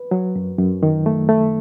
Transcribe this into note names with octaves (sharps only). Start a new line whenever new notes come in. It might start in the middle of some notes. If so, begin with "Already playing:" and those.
Already playing: B4
F#3
F#2
F#2
D#3
A3
A3